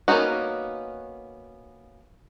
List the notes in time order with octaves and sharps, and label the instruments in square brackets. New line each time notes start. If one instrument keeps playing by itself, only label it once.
[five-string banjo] A#3 B3 C#4 D#4 F#4